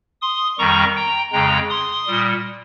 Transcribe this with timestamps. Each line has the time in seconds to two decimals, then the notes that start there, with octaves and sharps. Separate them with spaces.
0.22 C6 D#6
0.58 F2 D#3 G3 A#5 C#6
0.96 G5 A#5
1.32 F2 C#3 G#3 G5 A#5
1.70 C6 D#6
2.07 A#2 G3